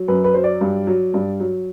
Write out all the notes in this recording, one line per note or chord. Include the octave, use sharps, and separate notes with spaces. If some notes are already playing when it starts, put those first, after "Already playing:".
Already playing: F#3
F#2 B4
B4
F#3 C5
D5
G2
F#3
G2
F#3